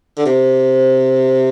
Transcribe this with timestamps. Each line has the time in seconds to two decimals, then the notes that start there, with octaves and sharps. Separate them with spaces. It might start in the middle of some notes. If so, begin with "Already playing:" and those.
0.18 D3
0.26 C3